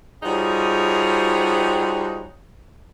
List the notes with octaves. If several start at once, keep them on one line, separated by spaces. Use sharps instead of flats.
F3 G3 D#4 F#4 G#4 C#5